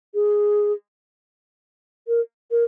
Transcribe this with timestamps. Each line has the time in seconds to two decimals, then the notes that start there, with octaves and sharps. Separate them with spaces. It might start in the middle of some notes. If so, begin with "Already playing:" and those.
0.14 G#4
2.08 A#4
2.51 A#4